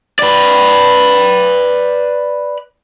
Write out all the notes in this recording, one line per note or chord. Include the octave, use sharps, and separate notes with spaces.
B4 D5